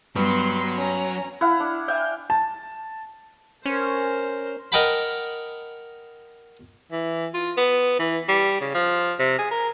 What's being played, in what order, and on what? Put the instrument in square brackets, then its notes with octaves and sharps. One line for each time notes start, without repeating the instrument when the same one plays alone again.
[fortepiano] G2 [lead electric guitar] F#3 [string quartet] B3 C6
[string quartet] C#4 A#5
[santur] E4 F5 F#5
D4
E5 F5 G5 G#5
[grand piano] A5
[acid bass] C#4 [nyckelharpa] A#4 C5
[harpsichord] A#4 D#5 F#5 G5 A5 B5
[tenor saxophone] E3
F4
B3
E3
G3
C#3
F3
C3
G#4
A#4